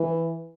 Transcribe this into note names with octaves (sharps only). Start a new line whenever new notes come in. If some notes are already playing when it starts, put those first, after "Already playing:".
Already playing: E3